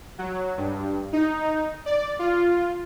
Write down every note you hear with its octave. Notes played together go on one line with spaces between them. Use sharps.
F#3
G2
D#4
D5
F4